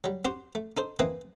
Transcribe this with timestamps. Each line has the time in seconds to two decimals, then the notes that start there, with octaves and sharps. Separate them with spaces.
0.04 F#3 G3
0.25 C4 F#4 G4 C5
0.55 A3
0.77 D#4 A4 C5
0.99 E3 A#3 C4 E4 B4 D#5